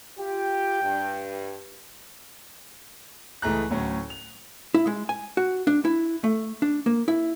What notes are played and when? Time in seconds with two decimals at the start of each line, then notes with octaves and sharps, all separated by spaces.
0.18 F4 G4 G5
0.83 G2
3.42 C#2 E3 A3 G#4 A#5 F#6
3.70 D2 A2 F#3 C#4
4.10 F7
4.74 E4
4.87 G#3
5.09 G#5
5.37 F#4
5.67 D4
5.85 E4
6.24 A3
6.62 D4
6.86 A#3
7.08 E4